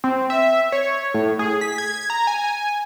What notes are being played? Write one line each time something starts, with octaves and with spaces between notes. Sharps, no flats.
C4
E5
C#5
A2
G#4
B6
G#6
A#5
G#5